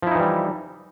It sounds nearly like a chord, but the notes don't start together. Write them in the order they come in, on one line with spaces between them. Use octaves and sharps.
F3 E4 D#4 E3 G3